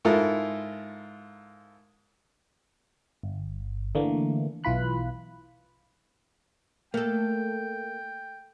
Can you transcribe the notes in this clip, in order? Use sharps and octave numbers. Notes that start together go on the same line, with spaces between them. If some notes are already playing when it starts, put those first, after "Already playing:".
G#2 E4 F4 A4 A#4
G1
D3 E3 A3 A#3
B1 E3 F4 B5 F#6
A3 A#3 A4 G5